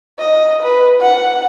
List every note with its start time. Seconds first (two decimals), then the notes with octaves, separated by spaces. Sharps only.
0.19 D#5
0.62 B4
1.00 F#5